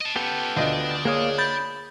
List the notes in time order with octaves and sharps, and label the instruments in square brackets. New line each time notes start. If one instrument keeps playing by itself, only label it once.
[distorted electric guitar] D#5 A5
[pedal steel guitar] B3 G4 A4 [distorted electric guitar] C#4 F4
[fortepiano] D2 F4 D#5 [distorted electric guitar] D4
[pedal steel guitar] A#3 F5 D#6 [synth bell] G#4 C#5
[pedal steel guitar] B5 [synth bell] G6 A6